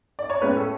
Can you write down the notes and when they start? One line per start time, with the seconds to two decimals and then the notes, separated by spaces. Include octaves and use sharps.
0.19 D5
0.30 C#5
0.41 A2 G#3 C#4 B4
0.57 A4